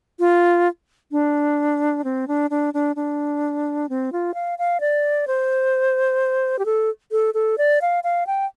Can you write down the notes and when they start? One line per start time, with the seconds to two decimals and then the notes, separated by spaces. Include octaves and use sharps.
0.20 F4
1.12 D4
2.04 C4
2.28 D4
2.50 D4
2.74 D4
2.96 D4
3.89 C4
4.12 F4
4.34 F5
4.58 F5
4.80 D5
5.27 C5
6.59 G4
6.65 A4
7.12 A4
7.34 A4
7.58 D5
7.82 F5
8.04 F5
8.27 G5